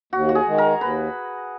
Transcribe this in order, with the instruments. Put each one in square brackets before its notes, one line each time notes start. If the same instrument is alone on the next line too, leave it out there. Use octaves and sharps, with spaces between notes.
[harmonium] D#2 [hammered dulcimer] F#4
[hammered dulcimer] F#4
G#4
[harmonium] D#3 G#3
[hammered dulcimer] A#4
[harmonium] D#2 [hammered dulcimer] B4